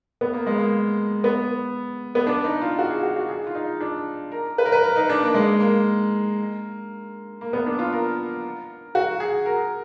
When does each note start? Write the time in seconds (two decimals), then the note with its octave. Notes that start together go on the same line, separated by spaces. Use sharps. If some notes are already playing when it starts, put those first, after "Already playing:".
0.21 B3
0.34 A#3
0.46 G#3
0.58 A#3
1.24 B3
2.15 B3
2.27 D4
2.44 D#4
2.61 F4
2.79 F#4
2.90 G#4
3.03 F#4
3.16 F#4
3.29 G#4
3.47 F4
3.55 D#4
3.80 D4
4.32 A#4
4.58 B4
4.66 A#4
4.72 B4
4.84 A#4
4.96 D#4
5.09 D4
5.22 A#3
5.34 G#3
5.60 A#3
7.41 A#3
7.53 B3
7.66 D4
7.79 F4
7.92 A#4
8.95 F#4
9.20 G#4
9.46 A#4